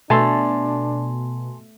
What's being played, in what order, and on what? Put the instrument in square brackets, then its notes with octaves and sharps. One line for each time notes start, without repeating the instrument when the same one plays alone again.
[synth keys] B2 [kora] A3 A4 [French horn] D4 [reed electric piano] G#5 A5 C6